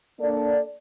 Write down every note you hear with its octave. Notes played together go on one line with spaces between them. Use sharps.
A#3 D4 A4 D5